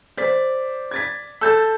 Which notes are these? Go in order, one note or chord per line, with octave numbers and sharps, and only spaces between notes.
C5 D5 B6
G#6 A6 B6
A4 E6 G6 A6